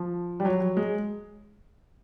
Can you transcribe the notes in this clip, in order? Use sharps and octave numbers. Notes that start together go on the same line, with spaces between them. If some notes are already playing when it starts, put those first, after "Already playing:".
Already playing: F3
G3
F#3
F#3
G#3